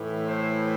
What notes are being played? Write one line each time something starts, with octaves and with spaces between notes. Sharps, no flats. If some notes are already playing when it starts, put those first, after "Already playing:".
Already playing: A2 E3
C5